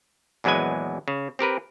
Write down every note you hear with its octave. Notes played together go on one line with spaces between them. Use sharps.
A#1 E2 F#3 G#3 B4 G#5
C#3
C4 G4 A#4 B4